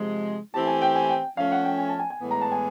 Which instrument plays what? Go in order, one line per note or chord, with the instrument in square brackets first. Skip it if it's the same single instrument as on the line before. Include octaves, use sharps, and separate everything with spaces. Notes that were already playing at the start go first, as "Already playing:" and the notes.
Already playing: [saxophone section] C3 F3 G#3
[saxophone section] E3 A3 C4 E4 G4 [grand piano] A5
[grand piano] G#5
G5
G#5
G5
[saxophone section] F3 A3 C#4 [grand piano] F5
[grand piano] F#5
G5
G#5
A5
G#5
G#5
[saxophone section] A2 E3 G#3 B3
[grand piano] A#5
A5
G#5